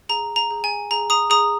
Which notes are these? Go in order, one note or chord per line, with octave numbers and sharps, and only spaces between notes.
G#4 A#5
A#5
G#4
G#5
G#4 A#5
A#5 D#6
G#4 A#5 D#6